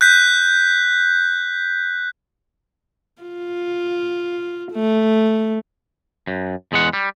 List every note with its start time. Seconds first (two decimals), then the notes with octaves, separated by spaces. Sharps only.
0.01 F#6 G6 B6
3.22 F4
4.72 A3
6.27 F#2
6.72 E2 G#3 F#5
6.93 G3